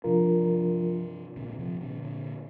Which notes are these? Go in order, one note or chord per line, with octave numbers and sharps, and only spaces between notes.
G2 C3 F3 D4 F4 A#4
A#2 D3
D3
C3 F3
A#2 D3
A#2 D3